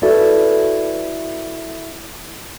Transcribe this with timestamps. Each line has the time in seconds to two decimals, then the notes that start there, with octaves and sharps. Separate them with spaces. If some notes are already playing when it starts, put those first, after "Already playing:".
0.02 E4 F#4 A4 B4 D5 E5